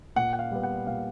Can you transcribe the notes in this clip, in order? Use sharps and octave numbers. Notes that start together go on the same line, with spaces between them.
A#2 F#5
F#5
F5
G3 B3
F#5
A#2 F5